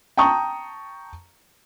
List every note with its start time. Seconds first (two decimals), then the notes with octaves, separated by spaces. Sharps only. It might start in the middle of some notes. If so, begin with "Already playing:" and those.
0.17 G5 A5 A#5 C#6 D#6